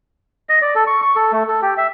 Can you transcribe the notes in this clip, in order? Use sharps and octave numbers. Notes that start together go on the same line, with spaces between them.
D#5
D5
A4
C#6
C#6
A4
A3
A4
G4
E5